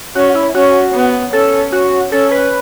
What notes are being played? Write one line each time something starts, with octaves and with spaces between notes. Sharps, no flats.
C#4 F#4
E4
C#4 F#4
B3
C#4 A4
F#4
C#4 A4
B4